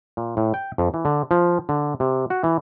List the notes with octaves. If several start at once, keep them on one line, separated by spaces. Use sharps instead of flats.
A#2
A2
G5
F2
E3
D3
F3
D3
C3
F#4
E3